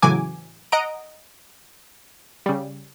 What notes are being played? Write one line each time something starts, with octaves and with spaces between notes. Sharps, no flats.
A2 C#3 E3 F#3 G#5 D6
D#5 F#5 A#5 D7
C#3 G3